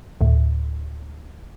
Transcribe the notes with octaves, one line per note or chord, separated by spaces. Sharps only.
D2 A2